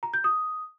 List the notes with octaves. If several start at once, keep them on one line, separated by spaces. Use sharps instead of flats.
A#5
G6
D#6